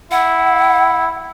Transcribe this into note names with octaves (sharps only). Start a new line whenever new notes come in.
E4 F#5